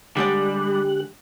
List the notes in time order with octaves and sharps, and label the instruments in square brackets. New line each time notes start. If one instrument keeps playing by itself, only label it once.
[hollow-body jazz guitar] D3 G#3 D5 [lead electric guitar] G3 [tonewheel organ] G4 F#6